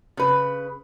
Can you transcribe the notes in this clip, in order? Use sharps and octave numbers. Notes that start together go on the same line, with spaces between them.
C#3 B4